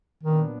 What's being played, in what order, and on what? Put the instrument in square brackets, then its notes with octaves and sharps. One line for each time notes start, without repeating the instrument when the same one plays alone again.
[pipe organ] A#2 F#3 B3 D4 [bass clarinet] D#3